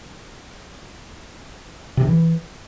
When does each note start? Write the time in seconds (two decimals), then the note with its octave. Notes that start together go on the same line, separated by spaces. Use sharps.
1.97 C3
2.03 D3
2.08 E3